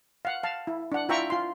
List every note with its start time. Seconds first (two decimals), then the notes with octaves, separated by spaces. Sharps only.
0.25 F5 F#5
0.43 F5 A5
0.67 E4
0.92 D4 F#5
1.09 E4 F4 E5 G5 A#5 C#6
1.30 F4 C6